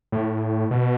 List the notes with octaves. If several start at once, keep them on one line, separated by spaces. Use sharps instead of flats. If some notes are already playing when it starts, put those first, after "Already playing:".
A2
B2